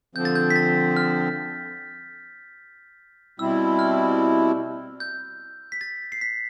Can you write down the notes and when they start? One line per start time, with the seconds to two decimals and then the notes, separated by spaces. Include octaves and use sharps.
0.15 D3 F3 C4 G6
0.25 A6
0.35 G6
0.50 B6
0.56 A6
0.97 F6
3.39 B2 G3 C4 E4 E6
3.79 F6
5.00 G6
5.72 B6
5.81 A6
6.12 C7
6.21 B6